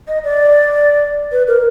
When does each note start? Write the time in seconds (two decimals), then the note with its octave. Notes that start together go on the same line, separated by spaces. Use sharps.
0.08 D#5
0.24 D5
1.32 B4
1.48 A#4